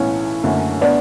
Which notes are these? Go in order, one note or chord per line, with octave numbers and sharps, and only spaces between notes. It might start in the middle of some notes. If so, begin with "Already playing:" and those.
Already playing: B1 A2 E3 B3 C#4 E4
F#1 F#2 D3 A3
B3 D4